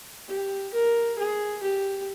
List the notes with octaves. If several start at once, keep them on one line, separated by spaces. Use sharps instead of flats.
G4
A#4
G#4
G4